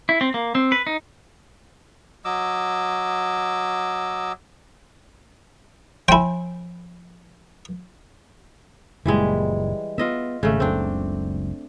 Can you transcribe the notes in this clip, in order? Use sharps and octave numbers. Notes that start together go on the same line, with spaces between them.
E4
C4
A#3
C4
B4
D#4
F#3 D#5 D6 E6
F3 E4 G5 G#5
F#1 A#2 E3 G3 G#3
B3 F4 D#5 E5
G#1 C#3 A3
F#1 C#2 C4 D4